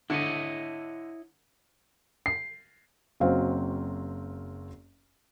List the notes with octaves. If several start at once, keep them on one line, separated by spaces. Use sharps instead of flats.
D3 E4 C#5 D#5
C7
F#1 F#3 C4 F5